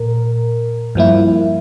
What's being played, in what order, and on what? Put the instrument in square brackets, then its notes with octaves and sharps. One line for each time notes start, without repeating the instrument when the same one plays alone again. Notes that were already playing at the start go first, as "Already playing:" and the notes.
Already playing: [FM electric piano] A#2 A#4
G2 F3 A#3 E4